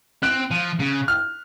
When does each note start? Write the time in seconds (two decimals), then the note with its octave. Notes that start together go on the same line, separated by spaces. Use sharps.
0.23 C4 F#6
0.51 F3
0.79 C#3
1.08 F6